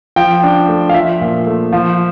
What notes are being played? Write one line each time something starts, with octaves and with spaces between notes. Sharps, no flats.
F3 G5
D4
A3
F5
F3 E5
A#2
A3
F3